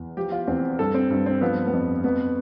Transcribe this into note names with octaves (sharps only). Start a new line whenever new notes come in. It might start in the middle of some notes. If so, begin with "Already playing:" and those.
Already playing: E2
F3 G4
F4
E2 C4
G2 A4
C4
G2
C4
F3 B3
B3
F2
F2 B3